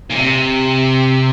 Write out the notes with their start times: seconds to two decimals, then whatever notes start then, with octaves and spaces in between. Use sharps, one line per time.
0.10 A#2
0.16 C3